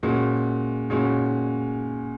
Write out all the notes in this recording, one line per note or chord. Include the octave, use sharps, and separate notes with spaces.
A#2 G#3 C#4 F#4
A#2 G#3 C#4 F#4